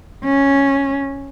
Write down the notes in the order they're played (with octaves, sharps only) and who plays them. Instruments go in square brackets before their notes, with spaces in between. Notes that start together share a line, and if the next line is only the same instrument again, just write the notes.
[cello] C#4